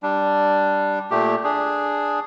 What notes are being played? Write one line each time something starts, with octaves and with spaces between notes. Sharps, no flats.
G3 D4
A#2 A3 G4
D4 G#4